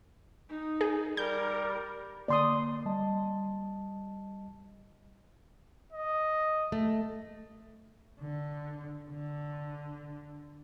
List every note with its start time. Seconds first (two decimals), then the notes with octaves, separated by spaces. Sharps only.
0.50 D#4
0.81 G#4
1.17 G3 A#4 G6
2.28 D3 A#3 D5 C6 D#6
2.86 G3 D#5 A5
5.93 D#5
6.72 A3
8.20 D3
9.11 D3